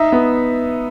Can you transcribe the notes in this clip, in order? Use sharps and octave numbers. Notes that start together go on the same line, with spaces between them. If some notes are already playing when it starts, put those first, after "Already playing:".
Already playing: D#4 E5
B3